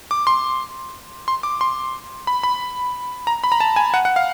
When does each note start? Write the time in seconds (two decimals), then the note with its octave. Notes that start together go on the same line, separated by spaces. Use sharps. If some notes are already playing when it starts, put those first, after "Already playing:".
0.11 D6
0.27 C6
1.28 C6
1.43 D6
1.61 C6
2.27 B5
2.43 B5
3.27 A#5
3.44 B5
3.52 A#5
3.60 A5
3.76 G#5
3.94 F#5
4.05 F#5
4.16 F5